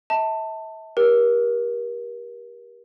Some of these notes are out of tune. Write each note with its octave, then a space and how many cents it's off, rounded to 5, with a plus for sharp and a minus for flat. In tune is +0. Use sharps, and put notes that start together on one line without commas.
E5 -40 A5 +15
G4 +0 A#4 +30